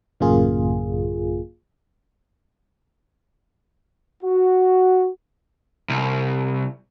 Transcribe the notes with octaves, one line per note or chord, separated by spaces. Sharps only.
A1 F#2 C#3 A#3 F4 G#4
F#4
C2